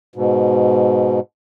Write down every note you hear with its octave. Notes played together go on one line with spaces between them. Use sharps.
G#2 B2